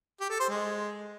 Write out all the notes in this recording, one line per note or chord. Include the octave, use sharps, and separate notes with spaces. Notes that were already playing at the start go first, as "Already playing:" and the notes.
G4
A4
C5
G#3